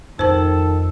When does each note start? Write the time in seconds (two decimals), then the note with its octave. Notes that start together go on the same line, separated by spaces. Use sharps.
0.19 F2 D#3 A4 C5 A5